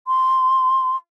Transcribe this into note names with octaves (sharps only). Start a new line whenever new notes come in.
C6